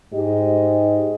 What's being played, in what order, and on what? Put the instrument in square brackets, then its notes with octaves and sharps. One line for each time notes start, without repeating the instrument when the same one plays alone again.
[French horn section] G#2 G4 D#5